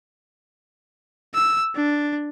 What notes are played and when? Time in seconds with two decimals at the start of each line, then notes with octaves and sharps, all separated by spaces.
1.34 E6
1.75 D4